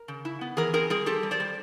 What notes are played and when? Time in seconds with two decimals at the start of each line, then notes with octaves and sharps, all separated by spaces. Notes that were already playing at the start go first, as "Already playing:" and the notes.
Already playing: A#4
0.08 C#3
0.25 E4
0.41 B3
0.57 E3 G#4 A#4
0.74 C4 G#4 A#4
0.90 G3 G#4 A#4
1.06 C4 G4 A4
1.23 G3
1.31 C5 D5
1.40 G3